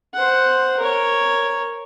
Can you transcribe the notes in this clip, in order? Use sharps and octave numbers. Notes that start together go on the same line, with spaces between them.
C5 F#5
A#4 C#5